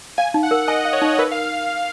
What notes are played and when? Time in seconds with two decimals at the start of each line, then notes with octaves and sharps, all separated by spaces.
0.18 F5 G#5
0.34 D#4
0.43 F#5
0.51 A#4
0.67 D#5 G#5
0.85 F5
0.93 C#5
1.02 D#4
1.19 A#4 B4
1.31 F5